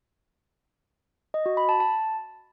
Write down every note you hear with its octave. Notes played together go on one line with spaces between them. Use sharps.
D#5
F#4
B5
A5
A5